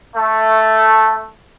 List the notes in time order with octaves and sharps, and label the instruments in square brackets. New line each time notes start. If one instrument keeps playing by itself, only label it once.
[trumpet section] A3